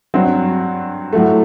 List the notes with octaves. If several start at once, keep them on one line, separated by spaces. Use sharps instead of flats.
G2 F#3 C4
A2 F#3 A3